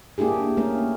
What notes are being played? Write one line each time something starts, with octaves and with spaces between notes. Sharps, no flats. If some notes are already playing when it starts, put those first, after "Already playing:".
A#3 D4 E4 G4 G#4
A3 A#3 C#4 A#4